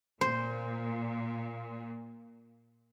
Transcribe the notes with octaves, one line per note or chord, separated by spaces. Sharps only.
A#2 C5